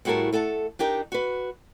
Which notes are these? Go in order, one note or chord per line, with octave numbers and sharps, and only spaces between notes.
A2 G3 F#4 G#4 A#4 A5
A3 A4 F#5 A5
D4 D#4 G4 A#4
F#4 B4